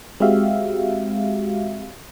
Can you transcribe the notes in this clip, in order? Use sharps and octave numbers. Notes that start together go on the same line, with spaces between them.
G#3 C4 F#4 G4 E5 F5